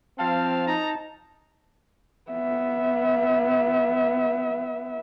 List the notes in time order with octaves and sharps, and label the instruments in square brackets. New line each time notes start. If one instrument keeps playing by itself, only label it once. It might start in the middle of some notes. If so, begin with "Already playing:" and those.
[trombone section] F3 C4 [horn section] F5 [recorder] A5
[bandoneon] D#4 [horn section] D#5 A#5
[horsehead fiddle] B3 E5